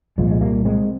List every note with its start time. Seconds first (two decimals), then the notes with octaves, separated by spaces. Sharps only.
0.18 C2 A#2 F3 G#3
0.31 G#3
0.41 G3 A#3
0.65 G#3 C4